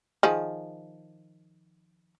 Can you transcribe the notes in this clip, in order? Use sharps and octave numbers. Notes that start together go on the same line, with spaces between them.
D#3 F3 G#4